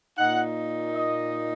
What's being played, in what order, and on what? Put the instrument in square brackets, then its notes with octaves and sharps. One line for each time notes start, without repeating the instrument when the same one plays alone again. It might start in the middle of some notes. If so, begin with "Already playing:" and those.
[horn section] A#2 A#3 D#4 F#5
D#5